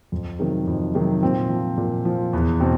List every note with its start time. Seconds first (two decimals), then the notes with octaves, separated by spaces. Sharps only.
0.12 F2
0.39 C3 D#3 F#3
0.67 F2
0.95 C3 D#3 F#3
1.22 A#2 C4
1.50 F3
1.78 A#2
2.05 F3
2.33 E2 B3
2.60 B2 C4